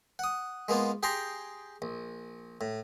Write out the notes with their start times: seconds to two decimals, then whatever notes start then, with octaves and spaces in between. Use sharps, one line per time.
0.19 F#5 D#6
0.68 G#3 A#3 B3 F4
1.03 G4 G#4 G5 A#5 C6
1.82 A#1
2.61 A2